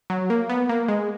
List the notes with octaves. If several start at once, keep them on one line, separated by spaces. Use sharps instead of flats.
F#3
A#3
B3
A#3
G#3